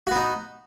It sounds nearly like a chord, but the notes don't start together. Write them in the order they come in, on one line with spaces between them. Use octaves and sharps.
F#4 B3 D#4